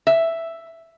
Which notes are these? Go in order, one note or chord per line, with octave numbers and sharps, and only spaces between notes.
E5